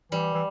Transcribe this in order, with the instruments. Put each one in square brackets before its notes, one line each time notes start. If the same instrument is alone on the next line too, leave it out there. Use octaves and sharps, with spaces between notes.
[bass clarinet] E3 [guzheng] G3
[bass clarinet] E3